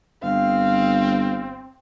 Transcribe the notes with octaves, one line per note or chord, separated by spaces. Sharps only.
G1 C4 F5